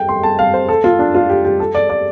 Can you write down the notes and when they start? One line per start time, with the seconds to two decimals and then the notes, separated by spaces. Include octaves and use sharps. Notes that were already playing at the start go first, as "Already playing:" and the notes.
Already playing: G5
0.09 C6
0.23 A5
0.39 F5
0.54 C5
0.69 A4
0.84 F4
0.99 D4
1.14 F4
1.29 G4
1.45 G4
1.60 A4
1.75 D5
1.90 D5